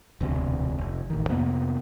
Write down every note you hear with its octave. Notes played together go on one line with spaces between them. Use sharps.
E1 D2 C3
F1
A1 D#3
F2 C3 A#3 B3